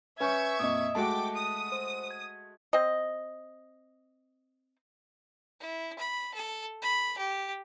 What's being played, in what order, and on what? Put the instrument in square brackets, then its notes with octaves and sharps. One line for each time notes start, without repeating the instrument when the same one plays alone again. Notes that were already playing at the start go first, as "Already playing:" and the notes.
[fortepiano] C#4 [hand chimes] B4 G#5 G6 [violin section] E5 C#6 G#6
[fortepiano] F2 A#2 [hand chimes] D#5 D#6
[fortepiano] G#3 A3 F#4 [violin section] G5 D6 [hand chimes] A5
[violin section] D#6
[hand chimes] C5
G#6
[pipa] C4 D#5
[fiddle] E4
B5
A4
B5
G4